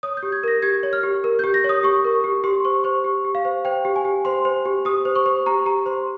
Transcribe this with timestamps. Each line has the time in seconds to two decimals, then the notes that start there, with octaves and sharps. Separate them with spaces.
0.03 C#5 D#6
0.17 G6
0.23 G4
0.32 G#6
0.44 A#4 A#6
0.62 G4 G#6
0.83 C#5
0.93 F6
1.03 G4
1.24 A#4
1.39 G4 G6
1.54 A#6
1.64 C#5
1.69 D#6
1.83 G4 C#6
2.05 A#4
2.24 G4
2.44 G4 C6
2.65 C5 C#6
2.84 C5 C#6
3.04 G4
3.25 G4
3.35 F5
3.45 C5
3.65 C5 G5
3.85 G4
3.96 G#5
4.05 G4
4.25 C5 C6
4.45 C5
4.65 G4
4.85 G4 D#6
5.05 C5
5.16 C#6
5.26 C5
5.46 G4 A#5
5.66 G4 A#5
5.86 C5 C6